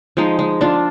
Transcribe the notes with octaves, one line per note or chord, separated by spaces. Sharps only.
F3 G#3 D#4
G#3
D4 F4